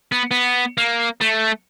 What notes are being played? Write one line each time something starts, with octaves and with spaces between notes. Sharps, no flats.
B3
B3
A#3
A3